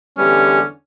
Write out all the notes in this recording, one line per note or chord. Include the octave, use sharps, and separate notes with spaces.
E2 D3 G3 C#4 A4